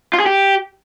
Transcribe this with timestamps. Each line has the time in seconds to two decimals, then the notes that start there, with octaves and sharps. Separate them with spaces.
0.13 F4
0.20 G#4
0.26 G4